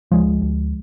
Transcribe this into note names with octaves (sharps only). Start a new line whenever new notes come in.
D2 F3 G#3
D2